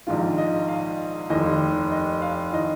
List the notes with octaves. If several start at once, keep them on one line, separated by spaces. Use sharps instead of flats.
A#1 G#2 D#3 F4
D#5
F5
F1 D#2 D#3 D#5
D#5
F5
D#3 D#5